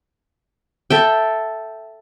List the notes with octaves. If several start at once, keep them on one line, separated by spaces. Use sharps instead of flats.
A4 E5 G5